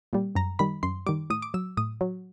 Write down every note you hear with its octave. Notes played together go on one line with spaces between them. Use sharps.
A#2 G3
F#2 A#5
D#3 G3 B5
F#2 C6
D#3 G3 D6
A2 D#6
D6
F#3 E6
A2 D#6
F#3